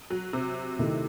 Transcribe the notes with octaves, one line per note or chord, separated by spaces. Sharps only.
F#3
C3
C3 D#3 A3 E4